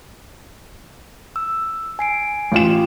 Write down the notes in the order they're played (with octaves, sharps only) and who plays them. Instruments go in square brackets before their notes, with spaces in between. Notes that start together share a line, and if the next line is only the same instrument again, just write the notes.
[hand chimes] E6
G#5 C7 D7
[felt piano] A1 F4 E7